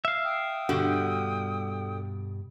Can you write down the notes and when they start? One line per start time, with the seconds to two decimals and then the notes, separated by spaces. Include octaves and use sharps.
0.05 E5 F5
0.24 G5 D#6
0.69 G2 B2 D3 G3 F#4 G4